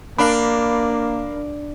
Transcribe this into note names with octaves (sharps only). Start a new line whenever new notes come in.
A#3 D4 A#4 F5 B5